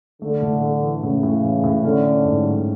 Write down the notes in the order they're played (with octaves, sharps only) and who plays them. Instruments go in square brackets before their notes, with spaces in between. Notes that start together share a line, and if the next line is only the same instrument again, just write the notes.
[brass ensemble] D3 [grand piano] A3
[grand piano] A2
A3
E3
[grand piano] A2 [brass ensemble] C#3
[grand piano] A2
E3
A2
[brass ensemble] D3 [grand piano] C#4
[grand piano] C#4
G#2
F#3